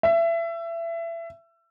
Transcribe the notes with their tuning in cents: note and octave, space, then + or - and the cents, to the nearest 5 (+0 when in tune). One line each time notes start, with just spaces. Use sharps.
E5 +25